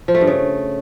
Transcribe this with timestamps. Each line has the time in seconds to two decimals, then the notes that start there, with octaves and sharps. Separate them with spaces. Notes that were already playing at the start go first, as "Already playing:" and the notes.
0.08 F3
0.15 A3
0.21 G2
0.27 C#3